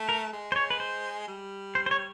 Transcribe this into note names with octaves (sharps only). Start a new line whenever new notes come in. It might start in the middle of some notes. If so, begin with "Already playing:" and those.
Already playing: A3
A#4
G#3
C5
C#5
B4
C5
G3
C5
C5
C#5